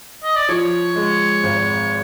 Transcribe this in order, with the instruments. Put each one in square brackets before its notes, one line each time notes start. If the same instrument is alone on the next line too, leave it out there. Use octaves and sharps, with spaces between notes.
[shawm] D#5
D5
[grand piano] F3 [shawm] C#5
[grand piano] G#3
G#1